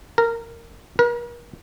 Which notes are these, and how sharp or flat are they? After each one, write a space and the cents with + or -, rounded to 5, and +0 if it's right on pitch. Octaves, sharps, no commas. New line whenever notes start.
A#4 -15
A#4 +40